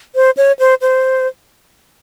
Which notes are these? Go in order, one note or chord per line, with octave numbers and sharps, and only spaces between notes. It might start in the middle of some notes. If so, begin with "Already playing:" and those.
C5
C#5
C5
C5